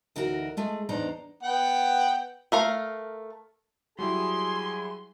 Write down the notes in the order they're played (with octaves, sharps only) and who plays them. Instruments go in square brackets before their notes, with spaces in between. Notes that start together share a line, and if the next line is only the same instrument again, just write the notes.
[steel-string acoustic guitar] D2 E3 D#4 F#4 A#4
G#3 A3 G#4
E2 D4 D#4 C5 A#5
[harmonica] B3 F#5 G5
[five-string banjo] A3 A#4 F5
[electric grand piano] F#3 G3 E4 [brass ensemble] G#4 G#5 [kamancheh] C6